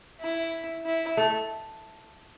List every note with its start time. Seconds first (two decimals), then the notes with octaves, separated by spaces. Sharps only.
0.20 E4
0.85 E4
1.17 A3